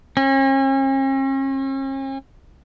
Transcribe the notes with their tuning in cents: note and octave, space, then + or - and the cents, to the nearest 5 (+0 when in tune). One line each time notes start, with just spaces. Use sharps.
C#4 -45